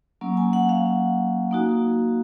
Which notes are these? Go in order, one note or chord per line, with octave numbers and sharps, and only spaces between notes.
F#3 A#3 C#4
G#5
F#5
F5
A#3 D#4 F#4